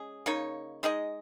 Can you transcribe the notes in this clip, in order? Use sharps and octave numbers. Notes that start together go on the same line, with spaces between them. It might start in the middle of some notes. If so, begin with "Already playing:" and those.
Already playing: G#3 C#4 G#4
C#3 A#3 D#4 C#5
G#3 D#4 G#4 D#5